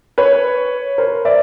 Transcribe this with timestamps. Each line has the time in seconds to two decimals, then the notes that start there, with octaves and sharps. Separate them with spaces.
0.18 B4 C#5
0.98 A#4 C5
1.25 D5 E5